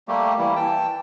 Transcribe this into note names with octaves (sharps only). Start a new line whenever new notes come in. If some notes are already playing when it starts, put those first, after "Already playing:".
G3 A3 A#3 G4
E3 G3 A#3 E4
E3 G5 A5